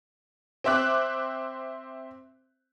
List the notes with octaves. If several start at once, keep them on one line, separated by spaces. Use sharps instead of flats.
C4 C5 E5 D6 F#6